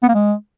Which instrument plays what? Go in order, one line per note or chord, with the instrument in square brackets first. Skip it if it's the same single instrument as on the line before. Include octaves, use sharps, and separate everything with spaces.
[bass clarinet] B3
A#3
G#3